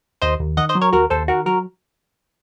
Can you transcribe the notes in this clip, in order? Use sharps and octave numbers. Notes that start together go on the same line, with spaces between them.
D#2 C5 D#5
D#2
D#3 D#5 F#5
C5 D#5
F#3
A#4 C#5
D#2 F#4 A#4
D#2 A4 C5
D#3 F#4 A#4
F#3 F#4 A#4